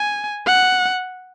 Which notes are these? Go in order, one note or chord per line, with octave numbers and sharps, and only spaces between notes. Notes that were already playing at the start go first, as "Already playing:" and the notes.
Already playing: G#5
F#5